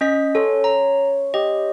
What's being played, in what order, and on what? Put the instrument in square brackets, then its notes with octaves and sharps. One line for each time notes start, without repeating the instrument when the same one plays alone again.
[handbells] C#4 D#5 B6
[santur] C#4 C#5 C6 [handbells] A4
[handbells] A#5
[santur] G4 [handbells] D#5